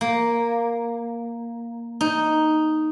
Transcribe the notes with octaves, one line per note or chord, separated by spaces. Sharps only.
A#3
D#4